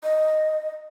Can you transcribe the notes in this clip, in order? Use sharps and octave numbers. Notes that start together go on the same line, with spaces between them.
D#5